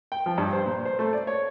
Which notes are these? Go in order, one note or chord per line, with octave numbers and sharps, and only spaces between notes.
G5
F3
G2
C5
A#2
C5
A3
D5
C#5